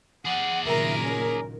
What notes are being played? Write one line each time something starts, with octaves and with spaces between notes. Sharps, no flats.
G#4 D5 F#5
F#1 A#2 D#3 A#4 E5
C#4